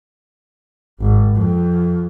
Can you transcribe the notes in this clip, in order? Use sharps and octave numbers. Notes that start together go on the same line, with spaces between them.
G#1
F2